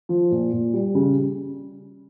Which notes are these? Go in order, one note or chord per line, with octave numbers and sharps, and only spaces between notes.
F3
A#2
A#2
G3
C#3